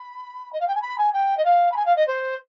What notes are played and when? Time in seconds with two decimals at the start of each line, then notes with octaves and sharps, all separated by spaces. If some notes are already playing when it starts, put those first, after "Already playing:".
Already playing: B5
0.53 D#5
0.60 F5
0.68 G5
0.75 G#5
0.82 B5
0.98 G#5
1.13 G5
1.37 D#5
1.45 F5
1.72 B5
1.76 G#5
1.86 F5
1.96 D#5
2.07 C5